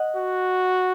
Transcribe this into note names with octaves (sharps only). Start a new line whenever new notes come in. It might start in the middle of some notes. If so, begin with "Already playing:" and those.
Already playing: D#5 F#5
F#4